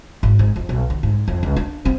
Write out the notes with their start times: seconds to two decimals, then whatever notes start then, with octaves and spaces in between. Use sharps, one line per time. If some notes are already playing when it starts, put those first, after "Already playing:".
0.23 G#1
0.39 G#2
0.56 F2
0.69 B1
0.90 D#3
1.03 G#2
1.28 F2
1.43 C#2
1.56 D4
1.85 C4